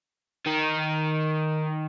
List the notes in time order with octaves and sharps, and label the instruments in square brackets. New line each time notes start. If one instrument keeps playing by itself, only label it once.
[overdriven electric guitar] D#3 D#4